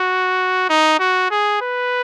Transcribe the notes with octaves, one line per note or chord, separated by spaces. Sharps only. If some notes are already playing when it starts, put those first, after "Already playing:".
Already playing: F#4
D#4
F#4
G#4
B4